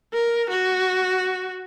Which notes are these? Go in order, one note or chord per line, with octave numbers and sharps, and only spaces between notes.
A#4
F#4